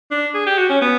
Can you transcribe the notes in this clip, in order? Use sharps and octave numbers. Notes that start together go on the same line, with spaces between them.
D4
G#4
G4
F#4
C#4
B3